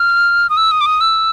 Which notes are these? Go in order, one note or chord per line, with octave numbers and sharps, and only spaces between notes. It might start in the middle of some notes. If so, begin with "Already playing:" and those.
Already playing: F6
D#6
E6
D#6
D6
D#6
E6